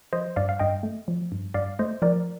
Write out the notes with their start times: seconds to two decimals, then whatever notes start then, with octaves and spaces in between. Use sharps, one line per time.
0.13 F3 C5 D#5
0.36 G2 D5 F5
0.49 F5
0.59 G2 D#5 G5
0.83 A3
1.08 F3
1.32 G2
1.54 G2 D5 F5
1.79 A3 C5 D#5
2.02 F3 A#4 D5